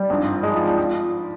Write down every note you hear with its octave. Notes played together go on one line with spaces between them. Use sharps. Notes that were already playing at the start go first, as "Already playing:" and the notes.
Already playing: G3
G#1 G2 F3
F3 G#3
F3
F3
F3